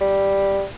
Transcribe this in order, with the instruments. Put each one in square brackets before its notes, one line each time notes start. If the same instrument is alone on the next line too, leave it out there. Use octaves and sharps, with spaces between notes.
[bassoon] G3